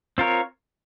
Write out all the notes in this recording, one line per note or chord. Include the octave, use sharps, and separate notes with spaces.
C4 F4 A#4 C#5